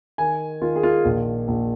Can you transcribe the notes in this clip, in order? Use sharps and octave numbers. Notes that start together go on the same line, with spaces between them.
D#3 G#5
D#3 F4
G#4
F4
A#1
A#1